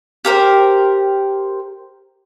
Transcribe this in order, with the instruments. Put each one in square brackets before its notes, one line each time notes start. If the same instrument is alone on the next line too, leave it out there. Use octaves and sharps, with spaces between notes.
[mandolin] G4 A#4 C5